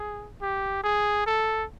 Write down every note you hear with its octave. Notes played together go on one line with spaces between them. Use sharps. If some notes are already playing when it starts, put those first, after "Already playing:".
Already playing: G#4
G4
G#4
A4